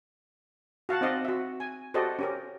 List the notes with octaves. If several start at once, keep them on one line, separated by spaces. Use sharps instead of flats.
F#4 F5 F#5 A5
C4 D#4 D5 D#5 F5 F#5
F#4 E5
G#5
F#4 G4 A4 C5 D5 D#5
C#4 G4 A#4